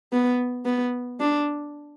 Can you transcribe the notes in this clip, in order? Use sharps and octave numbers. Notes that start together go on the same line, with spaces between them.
B3
B3
D4